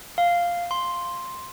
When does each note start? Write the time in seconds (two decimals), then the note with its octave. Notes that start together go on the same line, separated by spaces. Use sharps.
0.18 F5
0.71 C6